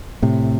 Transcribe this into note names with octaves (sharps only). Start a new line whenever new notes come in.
A2 C3